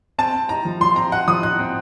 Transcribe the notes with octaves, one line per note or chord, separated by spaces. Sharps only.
C4 A5
C4
D#4 A#5
F3
F3 C6
C4 A#5
D#4 F#5
F3 D#6
D#4 F#6
C4